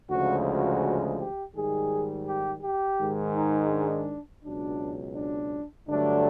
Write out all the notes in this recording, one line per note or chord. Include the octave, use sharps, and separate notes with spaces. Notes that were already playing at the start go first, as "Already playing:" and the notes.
D2 C#3 F3 G#3 F#4
F#4
G4
G#2 D#3 G3 G#4
G4
G4
G#2 D#3 G#3
D#4
D4
C#2 B2 F#3 D4
D4
G2 D3 F#3 A3 D4